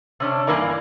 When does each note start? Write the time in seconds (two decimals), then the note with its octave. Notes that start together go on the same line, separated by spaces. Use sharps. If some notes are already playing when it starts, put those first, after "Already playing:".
0.20 C3 C#4 D4
0.47 G2 E3 A#3 A#4 D5 A#5